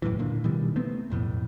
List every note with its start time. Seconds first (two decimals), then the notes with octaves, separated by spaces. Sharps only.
0.02 E1 F#2 A2 E3
0.19 A#2 D3 A#3
0.44 B2 D#3 E3 G3
0.76 C3 A3 B3 C4
1.10 B1 F2 A2